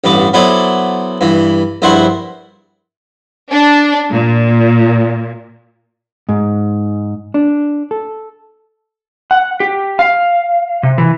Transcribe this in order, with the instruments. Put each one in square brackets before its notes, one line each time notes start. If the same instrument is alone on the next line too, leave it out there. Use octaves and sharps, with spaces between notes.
[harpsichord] A1 G2 B3 D6
F#3 B3 E4 A4 C5 D5
G2 E3
A#1 G2 E4 C5 F#5 C#6
[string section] D4
A#2
[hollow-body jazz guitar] G#2
D4
A4
[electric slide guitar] F#5
G4
F5
C3
E3